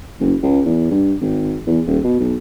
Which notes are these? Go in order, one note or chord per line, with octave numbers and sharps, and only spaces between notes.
F#1
C#2
E2
G2
G#1
E2
D#1
B2
B1